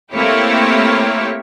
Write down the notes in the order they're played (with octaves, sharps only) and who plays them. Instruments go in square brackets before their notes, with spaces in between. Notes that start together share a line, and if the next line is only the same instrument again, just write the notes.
[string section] A3 A#3 C4 E4 G4 C#5